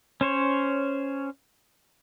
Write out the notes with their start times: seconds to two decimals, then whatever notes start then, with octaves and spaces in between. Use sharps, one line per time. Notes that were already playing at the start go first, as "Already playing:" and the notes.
0.21 C#4 C5 C#5